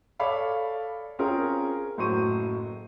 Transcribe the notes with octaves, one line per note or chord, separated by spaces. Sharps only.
A4 C#5 D5 F5 B5 D6
C4 C#4 F4 G#4 A#4
F#1 A2 F#3 C5 C#6 D#7